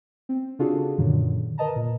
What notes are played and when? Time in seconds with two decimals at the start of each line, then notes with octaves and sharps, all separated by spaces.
0.29 C4
0.59 C#3 D4 F4 F#4 G#4 A4
0.98 F#2 A#2 D3 D#3 F#3
1.58 A#4 B4 D#5 A5 A#5
1.76 A#2